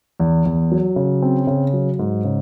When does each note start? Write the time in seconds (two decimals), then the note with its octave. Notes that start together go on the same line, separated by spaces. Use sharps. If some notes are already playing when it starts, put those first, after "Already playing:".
0.20 E2
0.45 E2
0.71 F#3
0.96 C#3
1.22 C4
1.47 C#3
1.73 F#3
1.99 G#2
2.24 C#3